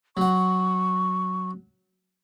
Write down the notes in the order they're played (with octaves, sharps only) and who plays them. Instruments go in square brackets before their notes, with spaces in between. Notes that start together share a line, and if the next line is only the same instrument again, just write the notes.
[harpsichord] F#3 F#5 [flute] C#6